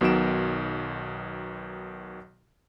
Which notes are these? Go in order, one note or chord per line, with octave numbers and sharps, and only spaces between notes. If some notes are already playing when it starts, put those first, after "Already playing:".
B1 B2 D#3 F#3 D7 E7